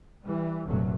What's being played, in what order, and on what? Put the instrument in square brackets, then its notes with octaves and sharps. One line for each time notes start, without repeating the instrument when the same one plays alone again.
[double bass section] E3 G3
F1 G2 A#2 F#3 A3